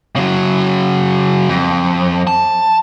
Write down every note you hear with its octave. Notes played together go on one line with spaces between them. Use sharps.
C#3 F#3
F2
A5